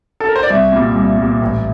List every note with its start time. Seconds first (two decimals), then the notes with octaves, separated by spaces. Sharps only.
0.20 A4
0.28 A#4
0.35 C5
0.43 D5
0.50 C2 E5
0.72 A#2 G3
0.96 C2
1.18 A#2 G3
1.42 A1